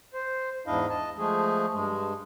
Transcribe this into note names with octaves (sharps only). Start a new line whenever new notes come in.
C5
E2 G#2 D4 E4 D#5 F5
D#5 A5
F3 G#3 A3 G#4
G2 G#3